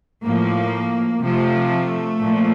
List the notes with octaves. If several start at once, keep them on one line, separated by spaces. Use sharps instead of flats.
A2 F3 A#3
C3 F3 A3
A#2 F3